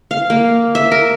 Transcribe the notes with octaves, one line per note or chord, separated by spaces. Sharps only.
F5
A#3
E5
A#4